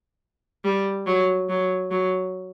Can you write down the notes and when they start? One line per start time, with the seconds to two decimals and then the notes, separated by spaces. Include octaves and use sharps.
0.65 G3
1.07 F#3
1.49 F#3
1.91 F#3